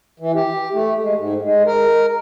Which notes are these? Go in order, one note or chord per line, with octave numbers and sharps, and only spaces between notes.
E3
G4
A3
G#3
G#2
G#3
A#4